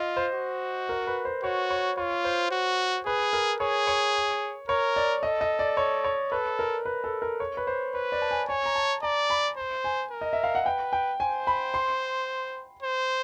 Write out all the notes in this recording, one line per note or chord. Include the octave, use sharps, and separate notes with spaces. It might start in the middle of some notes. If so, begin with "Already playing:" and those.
Already playing: F4 D#5
C5
F#4
A#4
B4
C5
F#4 C#5
C#5
F4 C#5
C5
F#4
G#4 B4
A#4
G#4 C#5
C#5
A#4 C#5
D5
A4 D#5
D#5
D5
C#5
C#5
A4 B4
A#4
B4
A4
A#4
C#5
B4
C5
B4 C#5
D5
A5
G#5
C#5 G#5
A#5
A5
D5 A#5
B5
C5
G#5
A#4
D#5
E5
F5
F#5
B4 G5
G5
C5 G#5
B5
C6
C5